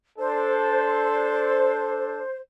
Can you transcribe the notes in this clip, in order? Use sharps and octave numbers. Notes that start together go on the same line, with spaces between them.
D4 A4 C5